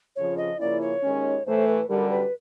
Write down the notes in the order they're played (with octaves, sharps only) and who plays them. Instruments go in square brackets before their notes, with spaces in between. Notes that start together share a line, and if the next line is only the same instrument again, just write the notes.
[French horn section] F2 C#3 F3 [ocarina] C#5
[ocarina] D#5
[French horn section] C#3 F3 A#3 C#4 E4 [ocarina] D5
[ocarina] C#5
[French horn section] D#2 D#3 G#3 C#4
[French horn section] A2 E3 A3 [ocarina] C5
[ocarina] B4
[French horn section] F#2 D3 G3 [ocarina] A#4
[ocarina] B4